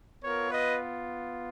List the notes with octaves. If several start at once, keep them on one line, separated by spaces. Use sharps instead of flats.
B3 F4 A#4 C#5
B4 D#5